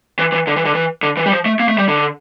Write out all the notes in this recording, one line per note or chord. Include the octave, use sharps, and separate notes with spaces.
E3
E3
D3
E3
D3
E3
D3
E3
G3
F3
A3
A#3
A3
G3
D3